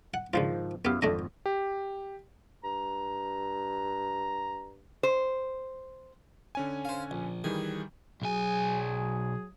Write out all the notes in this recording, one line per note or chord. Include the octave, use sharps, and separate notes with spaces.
F#5
C#2 G#2 D#3 F3 D4 F4
F#2 B3 E4 G4 F5
G#1 F2 A3 D4 D#5
G4
G2 A#5
C5
D3 C#4 G#5
C5 F5
A#1
D#3 E3 G3 G#4
B1 F#3 G#4 G#5